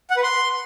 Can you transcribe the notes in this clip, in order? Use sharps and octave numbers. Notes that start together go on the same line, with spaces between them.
F#5
B4
C6